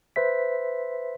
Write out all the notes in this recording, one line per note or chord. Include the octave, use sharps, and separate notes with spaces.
B4 C5 E5 B6